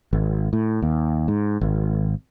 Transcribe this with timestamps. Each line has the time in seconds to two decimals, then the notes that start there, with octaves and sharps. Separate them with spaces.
0.13 G#1
0.53 A2
0.82 D#2
1.28 G#2
1.61 G#1